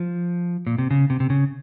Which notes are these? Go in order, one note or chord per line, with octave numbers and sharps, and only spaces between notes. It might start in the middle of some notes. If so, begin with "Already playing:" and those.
Already playing: F3
A#2
C3
C#3
C3
C3
C#3